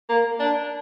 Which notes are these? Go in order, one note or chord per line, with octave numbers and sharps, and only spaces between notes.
A#3
D4